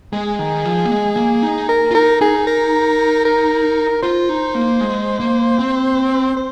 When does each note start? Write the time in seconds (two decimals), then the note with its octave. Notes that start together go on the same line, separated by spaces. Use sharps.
0.13 G#3 G#4
0.39 D#3
0.65 F3
0.85 A#3
0.91 G#3
1.17 A#3
1.43 D#4
1.69 A#4
1.91 F4
1.95 D#4 A#4
2.21 D#4 G#4
2.47 A#4
3.25 A#4
4.02 F4 C5
4.29 D#4
4.55 A#3
4.81 G#3
5.20 A#3
5.59 C4
6.37 C5